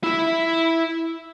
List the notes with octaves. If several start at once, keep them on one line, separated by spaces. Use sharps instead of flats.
E4 E5